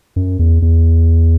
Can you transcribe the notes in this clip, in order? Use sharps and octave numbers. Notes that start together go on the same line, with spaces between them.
F#2
E2
E2